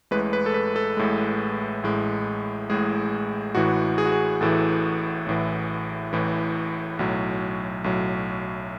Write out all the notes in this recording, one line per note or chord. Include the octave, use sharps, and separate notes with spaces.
A1 A2 G#3 B4
B4
A4
B4
A4
A1 A2 G#3
A1 A2 G#3
A1 A2 G#3 G#4
A1 A2 E3 F#4
G#4
F#4
G#4
A1 A2 E3 A4
A1 A2 E3
A1 A2 E3
B1 A2 F#3
B1 A2 F#3